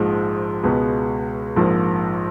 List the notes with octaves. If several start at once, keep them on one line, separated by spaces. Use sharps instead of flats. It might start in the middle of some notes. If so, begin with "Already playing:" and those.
Already playing: A#1 G#2 F3 G#3
C#2 B2 G#3 B3
A#1 G#2 F3 A#3